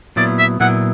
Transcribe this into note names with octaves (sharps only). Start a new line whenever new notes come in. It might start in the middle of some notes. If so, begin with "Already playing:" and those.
A#2 F#3 B3 E4 D5
E5
A#2 F#3 B3 E4 F#5